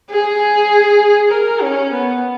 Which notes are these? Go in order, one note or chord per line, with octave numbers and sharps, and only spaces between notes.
G#4
A#4
C#4
B3